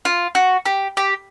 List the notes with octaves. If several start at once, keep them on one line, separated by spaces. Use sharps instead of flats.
F4
F#4
G4
G4